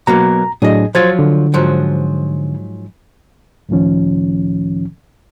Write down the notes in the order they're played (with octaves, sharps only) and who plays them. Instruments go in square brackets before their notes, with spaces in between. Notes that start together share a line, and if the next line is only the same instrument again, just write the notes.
[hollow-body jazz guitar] B2 F#3 A#3 [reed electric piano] A#5
[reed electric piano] A2 F#3 D4 [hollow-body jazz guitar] G#4 D#5
[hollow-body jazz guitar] F3 F#3 F4 [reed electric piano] C5 G#6 A6
[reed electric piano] D3
[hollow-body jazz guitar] G#2 F3 F#3
[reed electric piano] C#2 A2 D#3 F3 C#4